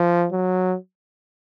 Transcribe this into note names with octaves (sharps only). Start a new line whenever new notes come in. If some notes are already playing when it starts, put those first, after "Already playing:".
Already playing: F3
F#3